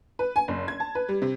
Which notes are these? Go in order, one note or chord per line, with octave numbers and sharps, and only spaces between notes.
B4
G#5
F#1
G#6
A5
B4
G3
C3